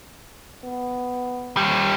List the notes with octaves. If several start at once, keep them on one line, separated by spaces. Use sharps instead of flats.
B3
D#2 G3